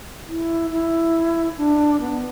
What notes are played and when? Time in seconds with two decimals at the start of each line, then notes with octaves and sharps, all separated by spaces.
0.27 E4
0.71 E4
1.57 D4
2.01 B3